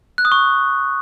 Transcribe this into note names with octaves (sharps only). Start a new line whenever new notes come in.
F#6
D#6
C#6